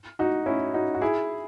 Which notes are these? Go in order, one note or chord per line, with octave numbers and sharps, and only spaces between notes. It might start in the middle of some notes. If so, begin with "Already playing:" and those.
D#4 F#4
C#4 E4
D#4 F#4
F#4
E4 G#4